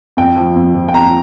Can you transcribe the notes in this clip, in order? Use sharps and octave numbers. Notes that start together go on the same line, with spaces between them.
F2 G5
F3
F2
F3
G5
F2 A#5